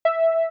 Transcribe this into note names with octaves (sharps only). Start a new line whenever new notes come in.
E5